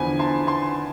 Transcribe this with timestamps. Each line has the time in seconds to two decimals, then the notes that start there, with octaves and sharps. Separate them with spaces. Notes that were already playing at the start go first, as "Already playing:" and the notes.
Already playing: E2 D3 F3 G#5 B5
0.19 A5 C6
0.47 A5 C6